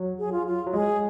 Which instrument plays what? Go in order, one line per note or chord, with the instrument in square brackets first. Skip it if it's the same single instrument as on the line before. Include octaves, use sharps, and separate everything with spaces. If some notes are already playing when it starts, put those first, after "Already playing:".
Already playing: [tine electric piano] F#3
[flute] G#4
F4
F4
[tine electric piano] F#3
[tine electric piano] G#3 [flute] G#4